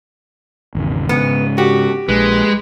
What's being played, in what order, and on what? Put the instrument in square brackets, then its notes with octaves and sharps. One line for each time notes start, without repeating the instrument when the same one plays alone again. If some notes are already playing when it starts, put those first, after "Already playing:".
[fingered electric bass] G#1 E2 C#3
[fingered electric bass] G#2 C#3 [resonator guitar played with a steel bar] B3
[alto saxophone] F#4 [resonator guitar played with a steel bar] G4
[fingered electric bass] A#1 [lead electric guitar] G#3 [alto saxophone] B4